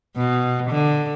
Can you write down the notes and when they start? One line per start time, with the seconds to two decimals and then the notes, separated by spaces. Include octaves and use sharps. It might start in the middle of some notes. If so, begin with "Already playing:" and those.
0.17 B2
0.70 D3